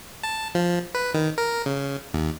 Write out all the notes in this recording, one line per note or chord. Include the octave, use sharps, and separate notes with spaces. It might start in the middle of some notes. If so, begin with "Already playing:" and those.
A5
F3
B4
D#3
A#4
C#3
D#2